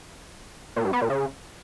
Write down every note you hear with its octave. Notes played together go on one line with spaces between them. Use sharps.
A#2
G2
B3
A#2
C#3